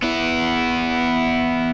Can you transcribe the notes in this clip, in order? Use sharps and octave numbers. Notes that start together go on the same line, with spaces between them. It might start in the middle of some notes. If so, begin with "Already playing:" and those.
B3 E4